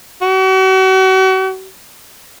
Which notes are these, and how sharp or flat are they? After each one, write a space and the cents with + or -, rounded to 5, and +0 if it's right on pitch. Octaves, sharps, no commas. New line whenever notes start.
F#4 +40